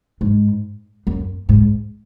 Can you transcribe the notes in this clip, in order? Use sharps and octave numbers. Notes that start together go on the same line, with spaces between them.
G#2
F#2
G#2